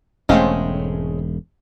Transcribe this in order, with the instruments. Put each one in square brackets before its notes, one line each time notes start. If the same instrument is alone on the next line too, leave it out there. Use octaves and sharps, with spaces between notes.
[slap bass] E1 G#2 [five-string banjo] G#3 C5 F5 [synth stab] A3 C4 C#4